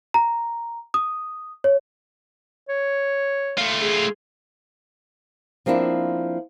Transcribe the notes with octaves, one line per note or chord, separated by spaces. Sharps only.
A#5
D#6
C#5
C#5
A3 F4
G#4
F3 A#3 C4 D4 E4